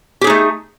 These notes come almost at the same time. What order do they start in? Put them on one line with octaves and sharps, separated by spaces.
G4 G#4 D#4 A3